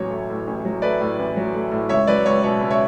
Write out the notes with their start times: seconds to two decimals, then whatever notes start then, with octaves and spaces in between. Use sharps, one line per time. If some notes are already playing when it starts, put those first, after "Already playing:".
Already playing: A1 F#3 C#5
0.10 A3
0.29 A2
0.47 A1
0.65 F#3
0.82 A3 B4 D5
1.01 A2
1.19 A1
1.37 F#3
1.54 A3
1.72 A2
1.89 C#2 C#5 E5
2.07 F#3 B4 D5
2.26 C#2 C#5
2.43 B2 C#5
2.61 C#2
2.71 C#5 E5